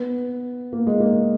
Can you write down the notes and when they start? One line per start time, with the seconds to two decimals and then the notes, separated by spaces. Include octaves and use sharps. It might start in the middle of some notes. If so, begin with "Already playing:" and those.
Already playing: B3
0.73 A#3
0.87 G#3
1.00 A#3